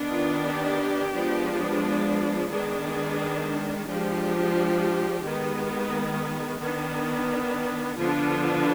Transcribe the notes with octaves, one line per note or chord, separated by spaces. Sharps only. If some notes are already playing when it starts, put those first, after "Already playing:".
Already playing: D#3 B3 D4
F4
G4
F3 G#3 B3 D4
D#3 G#3 B3 D4 G#4
G#4
F3 G#3 D4 G4
D#3 G#3 B3
D#3 B3 D4
D3 F3 B3 D4 F4